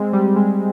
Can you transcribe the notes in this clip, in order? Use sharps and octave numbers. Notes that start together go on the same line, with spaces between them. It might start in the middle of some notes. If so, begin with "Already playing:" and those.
Already playing: G#3 C4
G3
G#3